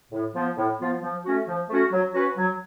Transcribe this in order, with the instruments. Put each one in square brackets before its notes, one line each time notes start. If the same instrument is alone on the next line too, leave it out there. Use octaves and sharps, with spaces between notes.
[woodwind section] A2
F3 B3 F4
A2
F3 B3 F4
F3
A3 C#4 F#4
F3
A3 C#4 F#4
F#3
C#4 F#4 B4
F#3